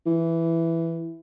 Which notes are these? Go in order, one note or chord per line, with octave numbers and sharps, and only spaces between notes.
E3